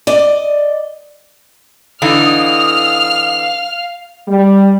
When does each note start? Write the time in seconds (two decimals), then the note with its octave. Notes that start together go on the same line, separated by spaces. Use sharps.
0.07 D5 D#5
2.02 D3 E3 D#4 F5 D#6 F6
4.28 G3